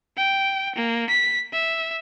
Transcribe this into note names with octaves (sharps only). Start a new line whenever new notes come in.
G5
A#3
B6
E5